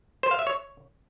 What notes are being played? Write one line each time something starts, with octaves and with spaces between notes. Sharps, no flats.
C5
F5
E5
C#5